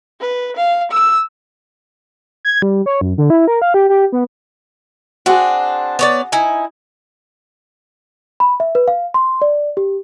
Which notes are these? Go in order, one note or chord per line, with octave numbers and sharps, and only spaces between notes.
B4
F5
E6
G#6
G3
C#5
F#2
D3
E4
A#4
F5
G4
G4
B3
C4 D4 F#4 G#4
B3 C#5 D5
D#4 E4 G#5
B5
E5
B4
F5
C6
D5
G4